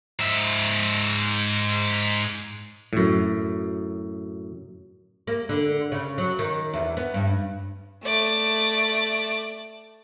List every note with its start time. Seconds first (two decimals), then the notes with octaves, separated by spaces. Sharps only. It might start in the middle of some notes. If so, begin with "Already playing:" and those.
0.19 G#2 E5
2.93 F#2 A2
5.27 A#3
5.49 D3
5.92 C#3
6.18 F#3
6.39 D#3
6.73 E2
6.97 B3
7.14 G2
8.04 A3 D5